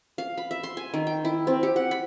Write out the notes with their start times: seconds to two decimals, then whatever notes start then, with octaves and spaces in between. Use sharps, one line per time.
0.18 F5
0.38 B5
0.51 E5
0.63 C6
0.77 G#5
0.94 D#3
1.07 G5
1.25 E4
1.47 C4
1.63 G4
1.76 F#5
1.91 B5